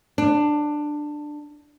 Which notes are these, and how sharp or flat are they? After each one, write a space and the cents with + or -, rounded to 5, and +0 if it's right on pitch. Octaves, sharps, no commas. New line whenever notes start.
D4 +15